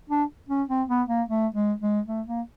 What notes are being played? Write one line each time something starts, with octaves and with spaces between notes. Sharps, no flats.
D4
C#4
C4
B3
A#3
A3
G#3
G#3
A3
A#3